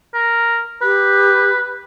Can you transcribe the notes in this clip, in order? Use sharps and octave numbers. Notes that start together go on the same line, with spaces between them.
A#4
G4 B4